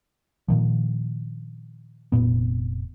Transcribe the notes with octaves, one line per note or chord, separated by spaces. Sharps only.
A#2 D#3 F3
F1 F#2 A#2 B3